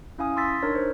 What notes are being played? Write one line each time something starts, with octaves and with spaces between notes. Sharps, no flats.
C#4 E4 F5 G#5 D#6
C6 E6 A6 B6
D4 D#4 A#4 C#5
C5